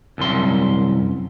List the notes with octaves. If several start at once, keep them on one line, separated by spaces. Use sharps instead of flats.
C2 F#2 C6